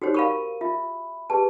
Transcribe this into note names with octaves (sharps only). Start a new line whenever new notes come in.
D#4 F#4 G4 C5 C#5
A#4 F5 B5 C#6 D#7
F4 E5 B5
G4 G#4 B4 A5